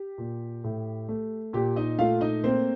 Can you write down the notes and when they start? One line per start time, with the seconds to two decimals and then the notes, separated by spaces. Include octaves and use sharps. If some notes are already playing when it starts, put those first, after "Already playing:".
Already playing: G4
0.18 A#2
0.64 A2
1.09 A3
1.53 A#2 G4
1.76 D#4 D#5
1.99 A3 F4 F5
2.21 D#4 D#5
2.44 A#3 C4 C5